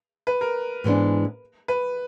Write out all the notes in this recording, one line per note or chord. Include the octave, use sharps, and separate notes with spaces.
B4
A#4
G#2 E3 G#3 B3 D4
B4